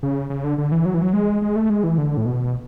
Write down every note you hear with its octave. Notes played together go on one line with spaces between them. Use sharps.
C#3
C#3
D3
D3
E3
F#3
E3
F#3
G#3
G#3
A3
G#3
E3
D3
A2
B2